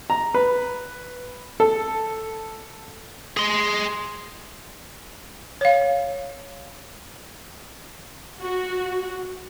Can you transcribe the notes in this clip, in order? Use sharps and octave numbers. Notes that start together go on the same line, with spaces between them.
A#5
B4
A4
G#4 C6
C#5 F5
F#4